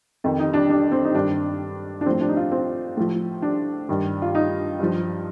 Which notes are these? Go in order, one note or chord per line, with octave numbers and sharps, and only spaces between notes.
F2 D#3
D#4
D4
D4
C4
D#4
G2 D#3 D4
D4
A2 F3 C4
D4
D#4
F4
C4
A2 F3
D4
G2 D#3
F4
D#4
G2 F3